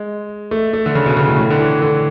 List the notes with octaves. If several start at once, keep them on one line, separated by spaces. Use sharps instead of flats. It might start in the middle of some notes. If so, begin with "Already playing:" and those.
Already playing: G#3
A3
A3
D3
C#3
B2
C#3
A2
A2
D3
E3
D3